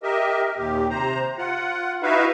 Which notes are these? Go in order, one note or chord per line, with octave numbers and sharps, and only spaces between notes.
G4 A#4 D#5 E5
D#2 A#2 G4
C3 C5 A#5
F4 F#5
D#4 E4 F#4 B4 E5 F5